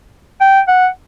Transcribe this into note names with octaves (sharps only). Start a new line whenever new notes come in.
G5
F#5